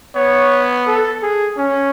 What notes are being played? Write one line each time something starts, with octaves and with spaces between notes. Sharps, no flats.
B3 C#5
A4
G#4
C#4